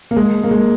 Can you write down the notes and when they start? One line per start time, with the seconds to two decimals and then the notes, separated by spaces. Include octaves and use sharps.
0.11 A#3
0.16 G#3
0.43 A#3
0.51 G#3